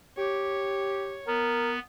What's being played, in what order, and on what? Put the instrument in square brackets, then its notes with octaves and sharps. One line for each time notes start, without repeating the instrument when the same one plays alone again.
[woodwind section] G4 [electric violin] C#5
[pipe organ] B3 [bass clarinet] A#4